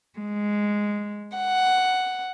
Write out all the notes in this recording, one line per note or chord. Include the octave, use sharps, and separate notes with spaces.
G#3
F#5